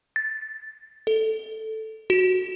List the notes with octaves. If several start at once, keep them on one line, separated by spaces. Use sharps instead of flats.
A6
A4
F#4